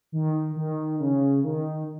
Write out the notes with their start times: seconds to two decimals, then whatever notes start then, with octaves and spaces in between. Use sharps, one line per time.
0.12 D#3
0.56 D#3
1.00 C#3
1.44 D#3